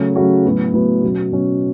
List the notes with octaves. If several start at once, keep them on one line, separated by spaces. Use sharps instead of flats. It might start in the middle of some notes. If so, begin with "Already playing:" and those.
Already playing: C#3 F#3 A3 C#4 F#4
C#3 F#3 A3 C#4 F#4
A2 F#3 B3
A2 F#3 B3
B2 F#3 C#4
B2 F#3 C#4